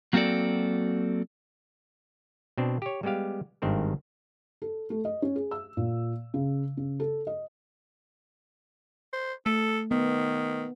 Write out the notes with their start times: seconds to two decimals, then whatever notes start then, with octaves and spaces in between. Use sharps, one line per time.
0.13 F#3 A#3 C4 F#4 A4 D5
2.58 B2 C4 D4
2.82 G4 C#5
3.03 G3 G#3 B3 G4 F5
3.62 G#1 G2 D#3 C4 A#4
4.62 A4
4.90 A3
5.05 D#5
5.22 C#4
5.36 G#4
5.51 E6
5.77 A#2
6.34 C#3
6.77 C#3
7.00 A4
7.27 D#5
9.13 C5
9.46 A3 A4
9.91 D#3 B3